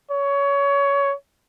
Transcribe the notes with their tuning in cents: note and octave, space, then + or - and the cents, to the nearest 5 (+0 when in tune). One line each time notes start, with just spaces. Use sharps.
C#5 +20